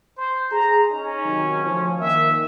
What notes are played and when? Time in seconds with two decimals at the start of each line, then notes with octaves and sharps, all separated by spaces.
0.17 C5
0.51 G#4 A#5
0.90 C#4 D#4
1.24 C3 D#3 F#3
1.63 D2 F3
1.99 D#3 A#3 E5